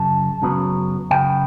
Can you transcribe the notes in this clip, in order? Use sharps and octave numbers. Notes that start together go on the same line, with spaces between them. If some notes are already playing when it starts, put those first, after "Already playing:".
Already playing: F#2 C#3 A5
F#2 C#3 F#3 B3
F#2 C#3 B3 G5